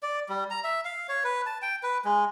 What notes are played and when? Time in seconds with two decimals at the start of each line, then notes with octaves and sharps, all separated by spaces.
0.03 D5
0.29 G3
0.50 A#5
0.64 E5
0.85 F5
1.09 C#5
1.24 B4
1.46 A5
1.62 G5
1.83 B4
2.05 G#3